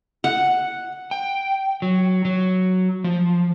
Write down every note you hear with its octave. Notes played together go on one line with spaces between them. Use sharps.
F#5
G5
F#3
F#3
F3